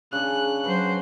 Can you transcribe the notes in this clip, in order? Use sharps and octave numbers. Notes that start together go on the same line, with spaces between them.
C#3 D4 F#6
F#3 B4 C5